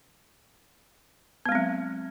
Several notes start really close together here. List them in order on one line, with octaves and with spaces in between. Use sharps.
B3 G#3 C4 F#3